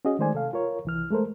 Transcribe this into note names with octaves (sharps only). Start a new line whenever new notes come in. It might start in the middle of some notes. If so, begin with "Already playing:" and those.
C#4 F#4 G#4 D#5
D#3 G#3 A3 C5 D5 G#5
C3 A4 F5
F4 A#4 C#5
C2 E3 F6
G#3 A3 A4 A#4 C5